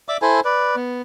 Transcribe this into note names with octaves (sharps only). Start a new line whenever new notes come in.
D5 E5 D6
E4 A4 C5 G#5
B4 D5
B3